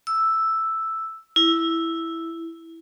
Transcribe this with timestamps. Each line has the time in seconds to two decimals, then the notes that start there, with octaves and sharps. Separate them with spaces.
0.07 E6
1.36 E4